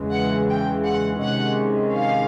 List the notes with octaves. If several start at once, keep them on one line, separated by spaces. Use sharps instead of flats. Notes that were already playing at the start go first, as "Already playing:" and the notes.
Already playing: E2 C#3 E3 G#3
F#5
G5
F#5
C3 D#3 G#3 C#4 F#5
F5